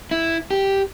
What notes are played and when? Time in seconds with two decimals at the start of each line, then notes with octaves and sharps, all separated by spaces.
0.11 E4
0.51 G4